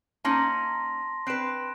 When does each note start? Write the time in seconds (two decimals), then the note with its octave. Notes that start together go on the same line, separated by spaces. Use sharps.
0.25 A#3 C#4 D#4 A5 C6 A#6
1.27 C4 B4 F#6 D7 E7